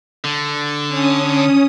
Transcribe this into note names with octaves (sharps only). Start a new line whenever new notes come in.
D3
C#4 D#6